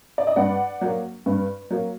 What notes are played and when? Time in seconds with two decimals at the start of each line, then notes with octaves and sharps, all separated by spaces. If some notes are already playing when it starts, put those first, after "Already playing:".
0.18 D5
0.27 D#5
0.36 G2 D5 F#5
0.81 F#3 A#3
1.26 G2
1.71 F#3 A#3